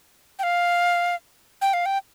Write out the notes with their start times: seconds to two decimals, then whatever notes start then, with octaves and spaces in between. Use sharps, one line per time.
0.39 G5
0.43 F5
1.62 G5
1.74 F5
1.86 G5